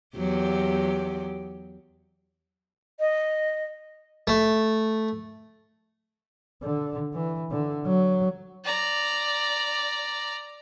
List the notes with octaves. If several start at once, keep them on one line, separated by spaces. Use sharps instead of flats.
E2 F#3 G4
D#5
A3
D3
E3
D3
F#3
D5 A#5